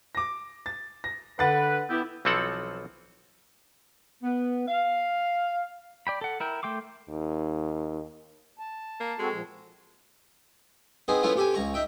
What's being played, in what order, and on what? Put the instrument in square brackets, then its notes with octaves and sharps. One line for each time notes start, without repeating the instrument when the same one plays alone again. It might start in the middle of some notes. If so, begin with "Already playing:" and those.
[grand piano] D6 A#6
A6
A#6
[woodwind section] D3 B4 [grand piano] F#5 A6
[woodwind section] B3 E4 G4
[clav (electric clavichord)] B1 E3 F3 C4 A4 F#5
[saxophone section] B3
F5
[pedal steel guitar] D5 G5 B5
A4 F#5
E4 A#4 G5
A3 G5 C6 D6
[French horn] D#2
[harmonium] A5
[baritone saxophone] A#3
[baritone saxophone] G#3 [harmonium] C4 F#4 A4
[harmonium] A#2 F3
[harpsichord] B3 C4 D#4 G#4
F3 A3 B3 C#4 E4 F4
C3 G4 A4 G#5
C#2 A#5 C#6
D#4 E5 G5